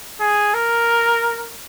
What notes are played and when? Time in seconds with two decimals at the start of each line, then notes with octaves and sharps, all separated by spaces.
0.21 G#4
0.54 A#4